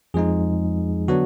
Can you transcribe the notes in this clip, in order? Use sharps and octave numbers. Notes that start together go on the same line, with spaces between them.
F2 F3 G#3 D#4 G#4
D3 F#3 B3 D4 F#4